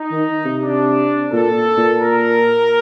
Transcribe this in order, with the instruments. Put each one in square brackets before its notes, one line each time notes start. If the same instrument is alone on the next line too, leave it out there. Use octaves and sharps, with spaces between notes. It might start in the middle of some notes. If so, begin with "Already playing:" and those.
Already playing: [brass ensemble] D#4
[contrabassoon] D#3
C3
[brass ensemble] D4
[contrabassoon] A#2 [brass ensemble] A4
[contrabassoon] A#2
[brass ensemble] A#4